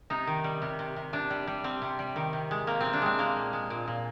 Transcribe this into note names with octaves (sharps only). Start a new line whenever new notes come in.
C3 D#4
D#3
G3
C3
C3
C3
C3 D4
G3
G3
G3 C4
C3
G3
D#3
C3
G#3
C3 A#3
C3 C4
D4
G#3 C4
G#3 A#3
A#2
G#3
A#2
A#2